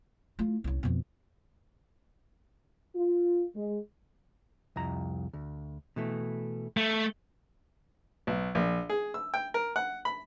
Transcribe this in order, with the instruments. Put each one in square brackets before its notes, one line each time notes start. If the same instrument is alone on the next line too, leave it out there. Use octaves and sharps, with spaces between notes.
[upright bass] A3 F4
C2 C#4
F2 B2
[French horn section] F4
G#3
[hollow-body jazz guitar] C2 F2 A#5
D2
B2 E3 A3
[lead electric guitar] A3
[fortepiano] B1
A#1
G#4
E6
G5
A#4
F#5
B5